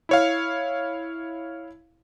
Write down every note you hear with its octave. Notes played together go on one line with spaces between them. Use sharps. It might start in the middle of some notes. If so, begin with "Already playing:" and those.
E4 C#5 F5